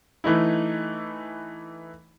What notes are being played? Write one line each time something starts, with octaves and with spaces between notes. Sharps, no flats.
E3 A3 D#4 E4